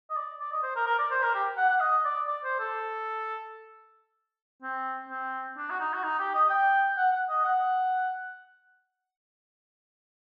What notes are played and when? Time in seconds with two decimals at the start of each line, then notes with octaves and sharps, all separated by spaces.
0.10 D#5
0.16 D5
0.40 D5
0.52 D#5
0.63 C5
0.76 A#4
0.86 A#4
0.99 D5
1.11 C5
1.22 A#4
1.35 G4
1.57 F#5
1.69 F#5
1.80 D#5
2.05 D5
2.27 D5
2.44 C5
2.60 A4
4.62 C4
5.09 C4
5.57 D4
5.70 F#4
5.80 D#4
5.93 F#4
6.04 D#4
6.19 G4
6.35 D#5
6.50 G5
6.97 F#5
7.12 F#5
7.29 D#5
7.45 F#5